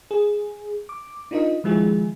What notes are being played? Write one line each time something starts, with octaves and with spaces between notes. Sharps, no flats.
G#4
D6
D4 D#4 F4 A#4 D#5
D#3 F3 G#3 E4 F4 G#4